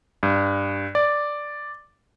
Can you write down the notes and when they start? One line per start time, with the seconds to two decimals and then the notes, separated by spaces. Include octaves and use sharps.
0.23 G2
0.95 D5